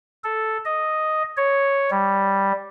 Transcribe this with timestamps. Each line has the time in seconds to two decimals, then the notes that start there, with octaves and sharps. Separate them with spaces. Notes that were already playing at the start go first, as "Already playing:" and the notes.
0.24 A4
0.65 D#5
1.37 C#5
1.91 G3